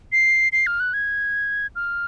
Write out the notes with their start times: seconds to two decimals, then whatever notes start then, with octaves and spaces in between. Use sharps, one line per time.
0.12 C7
0.52 C7
0.67 F6
0.80 F#6
0.94 G#6
1.76 F6